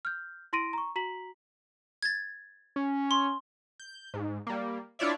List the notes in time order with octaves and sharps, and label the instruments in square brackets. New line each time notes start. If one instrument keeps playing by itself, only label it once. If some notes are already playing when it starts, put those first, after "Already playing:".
[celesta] F6 G6
E4 C6 A#6 D7 D#7
A#5 C#6
F#4 A#5 B6 F#7
[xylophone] G#6 A6
[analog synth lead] C#4
[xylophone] C6
[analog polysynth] G6
G#2
G3 A#3
D4 E4 F4 C#5 D5 E5